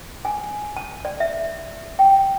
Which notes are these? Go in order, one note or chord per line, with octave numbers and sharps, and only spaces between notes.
G#5
A5
D5
E5
G5